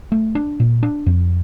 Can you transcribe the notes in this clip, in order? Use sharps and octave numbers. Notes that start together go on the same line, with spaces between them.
A3
D4
A#2
D4
F2